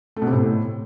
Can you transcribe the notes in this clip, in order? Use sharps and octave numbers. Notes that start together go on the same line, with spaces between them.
A3
B2
C3
A2